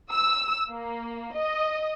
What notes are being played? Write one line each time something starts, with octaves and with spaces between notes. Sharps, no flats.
E6
A#3
D#5